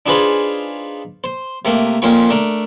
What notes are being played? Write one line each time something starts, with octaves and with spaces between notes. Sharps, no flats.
D4 D#4 F4 G#4 B4 C5
C5
C3 A3 A#3
F2 A#2 C#4 C5 G5 C#6
A3 D4 A#4